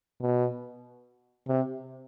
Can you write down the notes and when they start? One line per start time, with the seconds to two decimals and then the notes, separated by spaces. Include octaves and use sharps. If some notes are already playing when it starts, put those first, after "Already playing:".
0.21 B2
1.48 C3